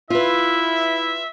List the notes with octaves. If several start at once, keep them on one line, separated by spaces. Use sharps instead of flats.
E4 F4 B4 E5